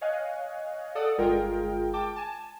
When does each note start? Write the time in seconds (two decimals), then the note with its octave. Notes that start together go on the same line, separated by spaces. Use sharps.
0.01 C#5 D#5 F5 G#5 F#6
0.95 A4 D5 F#5 D#6
1.18 G1 G#3 F4 G#4 A#4 G5
1.94 G5 A5 D6
2.16 G#5 A5